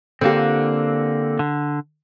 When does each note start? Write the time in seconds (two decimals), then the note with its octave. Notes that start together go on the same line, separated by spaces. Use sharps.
0.21 D3 A#3 C4 F4 G4
1.39 D3